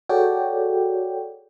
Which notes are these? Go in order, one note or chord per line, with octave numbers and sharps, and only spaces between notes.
F#4 G#4 A4 C#5 D5 G5